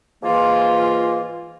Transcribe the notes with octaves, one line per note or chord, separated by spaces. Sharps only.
G#2 E3 A#3 F4